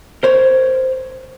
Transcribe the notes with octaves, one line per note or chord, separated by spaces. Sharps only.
A#4 C5 C#5